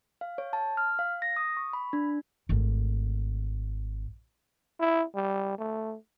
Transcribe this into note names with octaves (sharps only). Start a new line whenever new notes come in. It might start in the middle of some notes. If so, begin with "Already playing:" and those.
F5
C#5
A5
F6
F5
A#6
D#6
C#6
B5
D4
G#1 A3
E4
G3
A3